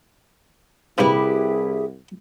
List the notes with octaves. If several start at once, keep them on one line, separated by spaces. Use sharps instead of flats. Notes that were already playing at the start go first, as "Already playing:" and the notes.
C2 G2 C3 A#3 E4 G4 G#4 B4